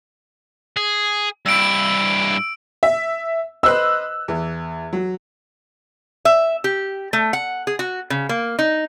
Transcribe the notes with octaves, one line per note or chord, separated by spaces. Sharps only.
G#4
G2 E4 E6 D7
E5
B4 C5 D#5 E6 F#6
E2
F#3
E5
G4
A3
F#5
G#4
F#4
C#3
A#3
D#4